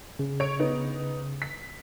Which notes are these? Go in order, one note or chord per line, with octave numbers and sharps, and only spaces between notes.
C#3
C#5 D7
B3 D#4
B6